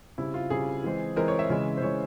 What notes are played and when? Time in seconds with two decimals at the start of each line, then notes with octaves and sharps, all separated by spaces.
0.18 C#3 G3 C4 E4
0.34 F4
0.50 C#3 G3 C4 G#4
0.84 E3 G#3 C4
1.16 E3 G#3 C4 A#4
1.28 C#5
1.39 E5
1.50 C#3 E3 G#3 C#4
1.77 C5
1.82 C#3 E3 G#3 C#4 C#5